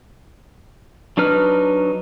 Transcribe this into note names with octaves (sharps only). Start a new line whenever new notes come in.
F#3 D4 D#4 B4 F6